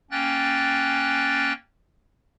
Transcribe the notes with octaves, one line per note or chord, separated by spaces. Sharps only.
A#3 C#4 G5 F#6 A6